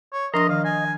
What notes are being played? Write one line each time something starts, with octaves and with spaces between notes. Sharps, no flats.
C#5
F3 D4 A#4 D#5 A#5 C6 A#6
D#3 D#5 F5
G#5